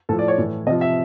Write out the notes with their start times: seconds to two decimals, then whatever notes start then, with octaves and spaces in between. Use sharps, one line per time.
0.09 A2 F3 A4
0.19 D5
0.28 C#5
0.38 A2 E3
0.67 C3 D#5
0.70 F3
0.81 E5